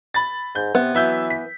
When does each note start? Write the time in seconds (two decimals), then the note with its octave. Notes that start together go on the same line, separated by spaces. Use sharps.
0.14 B5 A6
0.55 G#2 G6
0.75 C3 B3
0.95 E3 F#3 E5 G6
1.30 B6